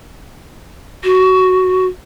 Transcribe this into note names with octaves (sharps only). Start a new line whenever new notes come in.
F#4